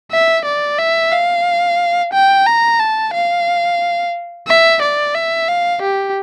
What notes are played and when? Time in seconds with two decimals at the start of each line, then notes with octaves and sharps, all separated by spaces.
0.11 E5
0.45 D5
0.79 E5
1.12 F5
2.13 G5
2.47 A#5
2.80 A5
3.14 F5
4.47 E5
4.82 D5
5.15 E5
5.48 F5
5.82 G4